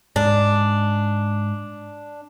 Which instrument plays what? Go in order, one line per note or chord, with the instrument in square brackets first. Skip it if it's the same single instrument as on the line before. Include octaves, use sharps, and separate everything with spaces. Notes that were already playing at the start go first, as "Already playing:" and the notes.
[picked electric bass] G#2 [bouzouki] D4